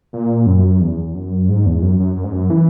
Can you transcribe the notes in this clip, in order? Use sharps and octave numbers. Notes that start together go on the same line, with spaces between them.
A#2
F#2
E2
F#2
G#2
E2
F#2
F#2
F#2
G#2
F#2
E3